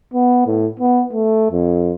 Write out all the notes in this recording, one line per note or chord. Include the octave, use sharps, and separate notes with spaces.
B3
A2
B3
A3
F2